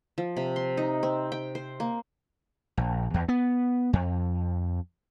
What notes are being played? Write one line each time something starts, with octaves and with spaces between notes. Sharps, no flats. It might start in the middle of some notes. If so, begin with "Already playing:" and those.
F3
C3
C6
D#4
C4
G5
C5
A#3
A#1
E2
B3
F2